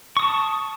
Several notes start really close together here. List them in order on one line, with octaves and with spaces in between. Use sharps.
C#6 D#6 A5